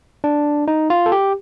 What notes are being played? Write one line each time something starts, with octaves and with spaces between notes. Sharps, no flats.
D4
D#4
F4
A4
G4